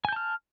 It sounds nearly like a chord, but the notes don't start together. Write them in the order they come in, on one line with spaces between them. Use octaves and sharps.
G#5 G6 A5 F6